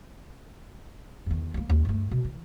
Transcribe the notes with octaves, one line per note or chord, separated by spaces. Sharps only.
E2 D#3
G3 A#3
D#2 C#4
G2 A3
B2
E3